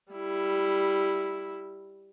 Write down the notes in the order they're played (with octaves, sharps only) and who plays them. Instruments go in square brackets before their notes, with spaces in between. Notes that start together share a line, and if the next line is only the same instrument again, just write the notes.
[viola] G3 E4